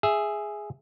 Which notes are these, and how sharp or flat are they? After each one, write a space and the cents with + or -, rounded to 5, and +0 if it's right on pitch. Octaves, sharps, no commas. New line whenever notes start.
G#4 +0 E5 +5